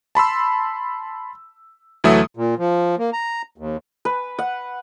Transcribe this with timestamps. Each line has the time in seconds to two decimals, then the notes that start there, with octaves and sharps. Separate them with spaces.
0.15 A5 B5 C6 E6
2.04 D2 E3 F#3 A3 E5 D#6
2.37 A#2
2.58 F3
2.98 A#3
3.13 A#5
3.58 D#2
4.05 B4
4.39 F#5